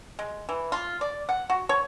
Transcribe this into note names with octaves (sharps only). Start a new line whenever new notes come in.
G#3
E3
F4
D5
F#5
F#4
C#5